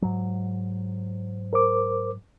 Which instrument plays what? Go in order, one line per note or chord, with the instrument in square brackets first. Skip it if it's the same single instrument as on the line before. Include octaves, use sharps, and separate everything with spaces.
[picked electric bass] G#2 F#3
[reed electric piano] A#4 C5 D6